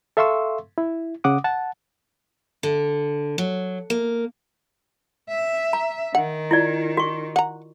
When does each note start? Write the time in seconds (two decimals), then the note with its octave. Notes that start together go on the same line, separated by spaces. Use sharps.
0.17 A4 E5 F5 C6 C#6 E6
0.78 E4
1.24 C#3 F#5 D6 D#6
1.44 F#5 A5
2.63 D3
3.38 F#3
3.90 A#3
5.29 E5
5.73 A#5
6.15 D#3 F#5
6.51 E4 F4 D5
6.97 F#4 C#6
7.36 F#5 A#5